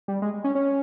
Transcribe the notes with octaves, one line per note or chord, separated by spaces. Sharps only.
G3
G#3
C#4
C#4